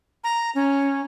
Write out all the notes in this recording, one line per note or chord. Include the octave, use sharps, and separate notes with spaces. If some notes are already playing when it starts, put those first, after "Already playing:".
A#5
C#4